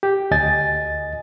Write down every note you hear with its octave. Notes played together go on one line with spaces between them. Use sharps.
G4
D2 D#5 G#5 A6